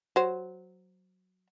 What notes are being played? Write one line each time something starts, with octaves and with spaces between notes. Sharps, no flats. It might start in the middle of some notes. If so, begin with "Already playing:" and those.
F#3 C5